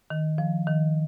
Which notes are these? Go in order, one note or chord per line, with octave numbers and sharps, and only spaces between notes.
D#3
F3
D#3